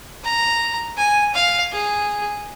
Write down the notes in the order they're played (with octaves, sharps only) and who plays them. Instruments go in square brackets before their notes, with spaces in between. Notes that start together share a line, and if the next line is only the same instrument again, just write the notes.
[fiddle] A#5
G#5
F5
G#4